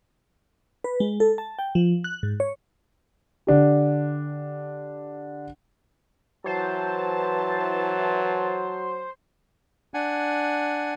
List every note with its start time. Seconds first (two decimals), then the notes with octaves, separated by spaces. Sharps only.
0.84 B4
1.00 G#3
1.20 A4
1.38 A5
1.59 G5
1.75 F3
2.04 F#6
2.23 G#2
2.40 C#5
3.47 D3 D4 G4
6.46 E3 F#3 C5 A5
9.94 D4 F#5 G#5